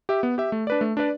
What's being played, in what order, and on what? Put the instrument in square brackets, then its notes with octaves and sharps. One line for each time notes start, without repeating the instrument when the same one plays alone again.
[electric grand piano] G4 E5
B3
G4 E5
A3
D4 B4 D5
A3
D4 B4 D5